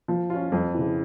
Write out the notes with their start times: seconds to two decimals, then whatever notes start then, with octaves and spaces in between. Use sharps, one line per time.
0.08 F3
0.30 C#4 F4
0.52 F2
0.74 C#3 E3